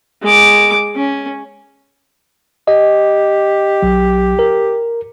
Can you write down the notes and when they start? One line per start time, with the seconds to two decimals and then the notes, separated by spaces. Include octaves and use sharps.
0.22 G#3 D6
0.95 C#4
2.68 G4 D#5
3.82 B1 F#3
4.39 A#4